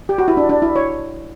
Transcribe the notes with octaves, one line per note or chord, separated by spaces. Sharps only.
G4
F#4
E4
D4
D4
E4
C#5